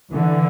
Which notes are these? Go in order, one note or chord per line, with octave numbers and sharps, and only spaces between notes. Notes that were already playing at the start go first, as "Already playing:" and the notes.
D3 E3